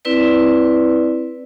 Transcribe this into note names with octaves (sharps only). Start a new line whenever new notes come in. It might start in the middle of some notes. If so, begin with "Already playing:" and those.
C4 E4 B4 D5